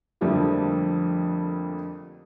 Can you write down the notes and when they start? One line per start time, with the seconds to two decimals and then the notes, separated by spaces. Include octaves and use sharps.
0.21 F2 D3 F3 G3 A3 A#3